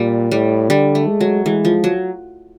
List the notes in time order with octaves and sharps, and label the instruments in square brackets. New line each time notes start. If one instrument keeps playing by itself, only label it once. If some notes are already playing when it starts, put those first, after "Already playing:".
Already playing: [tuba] A#2 [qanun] G3
[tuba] A2 [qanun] G3
[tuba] D3 [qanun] G3
[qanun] A3
[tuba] G#3
[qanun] F#3
[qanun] E3 [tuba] G#3
[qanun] F3
F#3